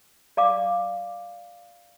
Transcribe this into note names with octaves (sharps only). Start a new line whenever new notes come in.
D5 F5 D6